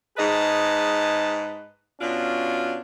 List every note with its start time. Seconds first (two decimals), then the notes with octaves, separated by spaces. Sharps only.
0.17 G#2 G#4 B4 D#5 A5
2.00 B2 C#4 D4 F4